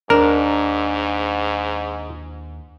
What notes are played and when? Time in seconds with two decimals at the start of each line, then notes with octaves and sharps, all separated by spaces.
0.10 D#2 G#2 D4 A#4